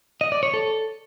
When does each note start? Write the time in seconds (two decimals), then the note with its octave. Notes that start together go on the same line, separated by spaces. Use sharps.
0.21 D#5
0.32 D5
0.43 C#5
0.54 A4